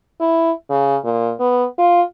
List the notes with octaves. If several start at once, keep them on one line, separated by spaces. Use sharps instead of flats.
E4
C#3
A#2
B3
F4